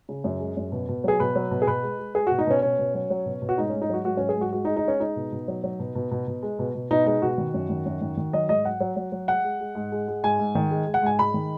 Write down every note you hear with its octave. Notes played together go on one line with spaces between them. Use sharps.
C#3
F#2
G#3
F#2
B2
B2
F#3 G#4
B2 B4
F#3
B2
G#4
B2 B4
G#3
G#3
G#3 G#4
B2 F#4
D#4
B2 C#4
B2 C#4
B2
F#3
F#3
B2
B2
F#4
G#2 D#4
G#2 C#4
D#4
F#3 F#4
G#2 F#4
F#3 C#4
G#4
G#2 F#4
G#3 F#4
D#4
G#3
D#4
G#3 C#4
G#3 D#4
B2
B2
F#3
F#3
B2
B2
B2
B2
G#3
B2
B2
B2 D#4
G#3 D#4
B2 F#4
D#3
F#2
D#3
F#2
D#3
D#3
F#3 D#5
G#2 D#5
F#3 F#5
F#3
F#3
F#3
G#3 F#5
G#3
G#3
G#2
G#3
G#3
G#2 G#5
G#2
D#3
G#3
G#3
F#5
G#2 G#5
G#3 B5
D#3